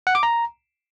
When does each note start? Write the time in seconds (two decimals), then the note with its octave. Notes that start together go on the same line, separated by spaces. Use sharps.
0.07 F#5
0.15 D6
0.23 A#5